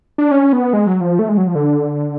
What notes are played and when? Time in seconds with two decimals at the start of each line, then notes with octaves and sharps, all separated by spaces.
0.18 D4
0.31 C#4
0.53 B3
0.73 G#3
0.87 F#3
1.01 F3
1.19 A3
1.29 G#3
1.38 F#3
1.47 F3
1.55 D3